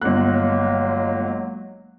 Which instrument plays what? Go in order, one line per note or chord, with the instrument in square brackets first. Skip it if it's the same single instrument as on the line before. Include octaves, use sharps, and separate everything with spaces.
[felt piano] G1 F#6 [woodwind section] F#3 G#3 A#3